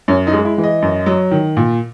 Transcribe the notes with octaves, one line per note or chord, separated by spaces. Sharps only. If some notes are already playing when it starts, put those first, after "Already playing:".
F#2 C#4
D#4
G#3
E4
E3
D#5
F#2
F#3
D#3
A#2